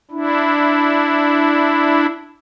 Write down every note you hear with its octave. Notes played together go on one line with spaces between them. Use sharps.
D4 E4